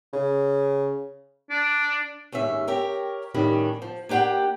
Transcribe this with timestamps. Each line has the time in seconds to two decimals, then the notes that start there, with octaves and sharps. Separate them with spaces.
0.13 C#3
1.50 D4
2.32 D#2 G#2 C#4 E5
2.67 G4 A#4 C#5
3.34 A2 D#3 G3 C#4 D4
3.82 F3
4.09 A#3 D4 G4 F#5 G5